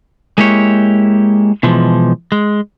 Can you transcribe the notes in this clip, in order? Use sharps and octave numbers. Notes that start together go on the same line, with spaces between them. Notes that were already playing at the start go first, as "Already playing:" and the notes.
G#3 A#3 E4 G4 C#5
B2 E3 F3 G#3
G#3